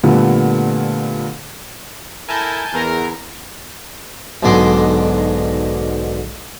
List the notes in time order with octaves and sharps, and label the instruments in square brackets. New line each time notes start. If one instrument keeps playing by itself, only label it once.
[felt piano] A#2 D3 G3 A3 B3
[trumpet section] E4 A4 A#4 [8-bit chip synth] G#5 A5 G6
[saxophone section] E2 [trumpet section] A#4
[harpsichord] B1 G#2 D3 B3 C6 D6